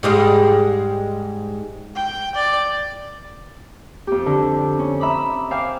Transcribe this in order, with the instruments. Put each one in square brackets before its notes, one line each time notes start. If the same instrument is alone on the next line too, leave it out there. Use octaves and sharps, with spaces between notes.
[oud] G#2 G3 G#3
[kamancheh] G5
D5
[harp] F2 G4
D3
C#4
E5 A#5 B5 D6 D#6
C5 E5 F5 G5 G#5 D6